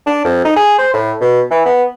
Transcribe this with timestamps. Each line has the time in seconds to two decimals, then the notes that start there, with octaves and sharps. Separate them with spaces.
0.06 D4
0.25 F2
0.45 D#4
0.56 G#4
0.79 C5
0.93 A2
1.21 B2
1.51 E3
1.65 B3